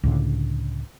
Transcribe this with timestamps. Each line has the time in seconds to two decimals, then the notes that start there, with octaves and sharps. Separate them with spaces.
0.03 C#2 A2 D3